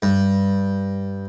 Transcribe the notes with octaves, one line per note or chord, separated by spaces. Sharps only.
G2